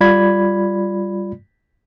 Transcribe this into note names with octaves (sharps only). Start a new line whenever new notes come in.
G3 F4 D5 B5 G#6